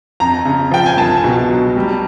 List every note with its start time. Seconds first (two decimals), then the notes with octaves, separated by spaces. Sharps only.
0.20 F2 A#5
0.45 C#3
0.71 F3 G5
0.86 G#5
0.97 C2 A5
1.24 B2
1.49 F#3
1.76 G3